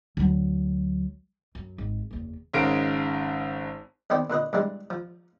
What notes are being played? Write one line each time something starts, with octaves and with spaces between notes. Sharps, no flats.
D2 F#3
F#2
G#1
F#1 E2
G#1 C#3 G#3 A#4 D7
E2 D#3 B3 C5 D5 G5
A#2 D3 B4 D#5
G2 E3 G3 G#3
F3